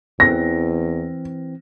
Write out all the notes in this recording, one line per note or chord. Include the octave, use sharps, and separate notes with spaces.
E2 E3 C4 A#6